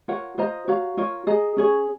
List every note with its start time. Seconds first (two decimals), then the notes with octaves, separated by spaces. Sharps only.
0.08 F4 A#4 C#5 F#5
0.38 F4 C5 D#5 A#5
0.68 F#4 C#5 F5 A#5
0.97 F4 A#4 C#5
1.27 G#4 D#5 A#5
1.57 C#4 G#4 C#5